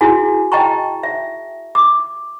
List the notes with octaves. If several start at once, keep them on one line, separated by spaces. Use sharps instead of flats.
E4 F#4 G#4 G#5
D#5 G5 A5 A#5 C#6
E5
D6